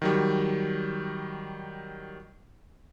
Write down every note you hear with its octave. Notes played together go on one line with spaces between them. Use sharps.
D#3 F#3 G3